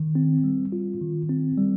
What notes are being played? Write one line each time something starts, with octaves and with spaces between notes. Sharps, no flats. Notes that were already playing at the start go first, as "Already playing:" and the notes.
Already playing: D#3
C4
G3
F4
D#3
C4
G3